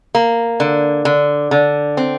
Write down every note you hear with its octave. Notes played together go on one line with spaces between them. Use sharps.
A#3
D3
D3
D3
C4